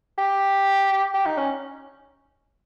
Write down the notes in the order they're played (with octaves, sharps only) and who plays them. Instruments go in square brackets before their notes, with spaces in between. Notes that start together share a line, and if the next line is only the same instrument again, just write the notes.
[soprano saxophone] G4
G4
D#4
C#4